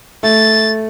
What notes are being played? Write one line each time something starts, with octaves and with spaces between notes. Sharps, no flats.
A3 A6